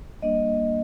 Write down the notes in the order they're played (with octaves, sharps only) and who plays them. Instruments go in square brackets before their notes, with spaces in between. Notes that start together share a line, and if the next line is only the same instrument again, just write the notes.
[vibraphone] G3 A#3 D4 D#5